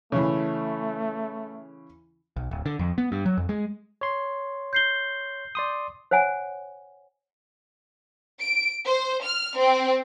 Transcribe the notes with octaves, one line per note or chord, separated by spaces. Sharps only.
C#3 E3 A3
B1
D1
D3
F2
B3
G2
F#3
F2
G#3
C#5 C6
G6 C7 G7
D5 C6 D#6
C5 C#5 F#5 G#5
D7
C5
F6
C4